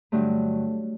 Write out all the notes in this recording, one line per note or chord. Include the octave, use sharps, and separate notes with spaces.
G2 D3 F#3 A3